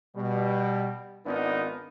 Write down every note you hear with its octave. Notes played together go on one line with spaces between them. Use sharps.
B2 G3
G#1 B3 D4 D#4 F4 A#4